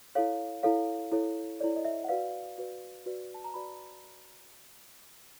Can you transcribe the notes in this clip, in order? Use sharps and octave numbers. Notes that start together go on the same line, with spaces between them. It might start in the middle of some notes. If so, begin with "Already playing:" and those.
E4 A4 C#5 F5
E4 A4 C#5 F5
E4 A4 C#5
E4 A4 C#5 D5
D#5
E5
F#5
F#4 B4 D5 F5
F#4 B4 D5
F#4 B4 D5
A5
A#5
F#4 B4 D5 B5